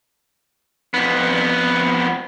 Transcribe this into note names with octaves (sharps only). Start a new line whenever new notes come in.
F2 B3